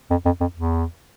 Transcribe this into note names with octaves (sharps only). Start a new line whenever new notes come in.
F2
F2
F2
E2